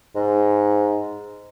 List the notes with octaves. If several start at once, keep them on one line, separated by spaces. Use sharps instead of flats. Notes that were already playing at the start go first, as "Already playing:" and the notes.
G#2